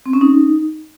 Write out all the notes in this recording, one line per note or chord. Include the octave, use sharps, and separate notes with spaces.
C4
C#4
D#4